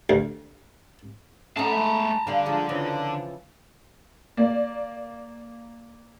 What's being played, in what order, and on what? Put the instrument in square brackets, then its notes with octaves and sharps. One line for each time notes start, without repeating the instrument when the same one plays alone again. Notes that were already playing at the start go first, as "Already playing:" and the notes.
[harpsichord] D2
[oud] A3 D#4 [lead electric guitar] C#4 F#5 [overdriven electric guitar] A5 A#5
[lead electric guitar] G#3 E5
[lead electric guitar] D3 D5 [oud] G3 F5
[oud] F3 G#3 D4
C#3 E3 F3
[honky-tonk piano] A#3 D5